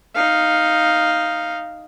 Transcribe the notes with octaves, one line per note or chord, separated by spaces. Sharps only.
D#4 F5